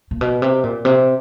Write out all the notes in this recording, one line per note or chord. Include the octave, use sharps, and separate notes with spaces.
A#2
B2
C3
A#2
C3